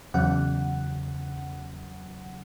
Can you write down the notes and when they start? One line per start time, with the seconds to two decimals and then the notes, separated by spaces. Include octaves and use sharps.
0.14 E2 C#3 F#3 F#5